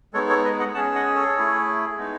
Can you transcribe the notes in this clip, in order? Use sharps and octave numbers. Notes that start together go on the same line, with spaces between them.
G#3 B3 D#4 A4 C#5
A4 C#5
B4 D#5
D#5 F#5
C#4 G#4 F#5 A5
D#5 F#5
A4 C#5
A3 E4 G#4
G#3 B3 D#4